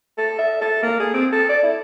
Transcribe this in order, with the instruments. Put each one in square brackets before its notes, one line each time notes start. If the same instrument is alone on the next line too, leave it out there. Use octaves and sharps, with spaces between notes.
[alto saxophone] A4
E5
A4
A#3
G#4
C4
A4
D5
E4